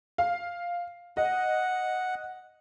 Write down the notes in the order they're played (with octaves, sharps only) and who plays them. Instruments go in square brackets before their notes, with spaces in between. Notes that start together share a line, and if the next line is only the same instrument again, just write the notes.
[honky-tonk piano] F5
[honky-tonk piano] D#5 [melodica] F#5